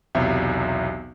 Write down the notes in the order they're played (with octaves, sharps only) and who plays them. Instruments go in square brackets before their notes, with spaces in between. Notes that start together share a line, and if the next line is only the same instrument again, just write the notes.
[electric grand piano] B1 E2 C3 E5